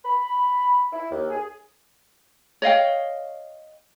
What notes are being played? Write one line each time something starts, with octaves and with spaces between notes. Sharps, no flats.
B5
E4
D#2
G#4
C#5 D#5 F5 G5